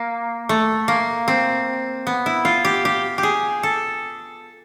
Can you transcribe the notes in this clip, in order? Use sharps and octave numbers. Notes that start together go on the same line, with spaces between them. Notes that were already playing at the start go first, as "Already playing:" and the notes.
Already playing: A#3
A3
A#3
C4
B3
E4
F4
G4
G4
G4
G#4
A4